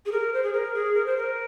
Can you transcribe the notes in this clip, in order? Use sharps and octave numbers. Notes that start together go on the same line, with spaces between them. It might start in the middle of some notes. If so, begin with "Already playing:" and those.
G#4
A#4
C5
G#4
A#4
G#4
A#4
C5
A#4